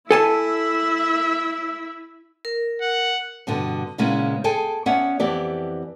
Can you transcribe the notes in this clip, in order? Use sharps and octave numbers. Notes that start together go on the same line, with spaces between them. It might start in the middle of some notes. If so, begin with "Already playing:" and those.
E4 A4 E5 G#5 A5
A#4
F#5
G2 B2 D3
A#2 C#3 G#3 B3 C#4 E4
G#4 A4 G5 G#5
B3 C#4 C#5 D5 E5 F#5
F2 E3 B3 G4 D5